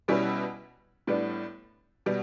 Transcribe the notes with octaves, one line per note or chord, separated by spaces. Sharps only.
B2 G3 C#4 E4 B4
A2 G3 B3 D4
B2 G3 B3